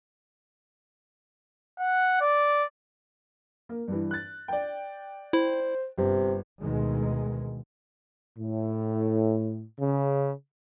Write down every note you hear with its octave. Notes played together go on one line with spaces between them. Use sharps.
F#5
D5
A#3
G2 E3
F#6 A6
D5 G5
E4 C5
G1 C3
D2 B2 D#3 G#3
A2
C#3